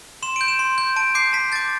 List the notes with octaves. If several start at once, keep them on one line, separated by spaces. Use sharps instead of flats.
C6 E7
G6 D7
E7
C6
G6
A5 D7
D6 G6 C7
A5 B6
D6 G6 A6